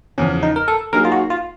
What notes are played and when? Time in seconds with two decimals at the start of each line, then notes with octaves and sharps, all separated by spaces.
0.18 E2 C#3 F3 C#4
0.43 D#4
0.56 A#4
0.68 A4
0.93 F#3 A#3 D#4 G#4 A#4
1.05 F4
1.12 F#4
1.30 F4